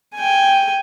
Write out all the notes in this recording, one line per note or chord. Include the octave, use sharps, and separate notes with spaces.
G5 G#5